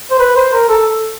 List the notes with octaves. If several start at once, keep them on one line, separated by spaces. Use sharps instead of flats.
C5
B4
C5
A#4
A4